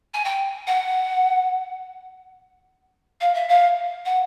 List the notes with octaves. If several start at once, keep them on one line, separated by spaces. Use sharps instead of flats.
G#5
G5
F#5
F5
E5
F5
F#5